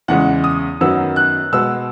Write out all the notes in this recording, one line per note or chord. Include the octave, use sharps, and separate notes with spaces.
E2 C#3 E3 G#3 F#5
D#6
F#2 D#3 F#3 B3 E6
F#6
B2 G#3 B3 E6